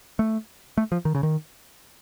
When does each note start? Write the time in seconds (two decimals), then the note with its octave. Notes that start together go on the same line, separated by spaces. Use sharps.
0.19 A3
0.78 A3
0.92 F3
1.05 D#3
1.15 C#3
1.23 D#3